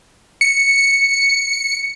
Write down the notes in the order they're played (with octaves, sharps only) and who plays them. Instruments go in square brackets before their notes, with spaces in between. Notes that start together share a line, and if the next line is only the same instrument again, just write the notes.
[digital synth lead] C#7